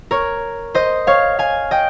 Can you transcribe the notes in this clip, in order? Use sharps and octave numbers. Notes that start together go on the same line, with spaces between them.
A#4 C#5
C5 D#5
C#5 F5
F5 G#5
D#5 G5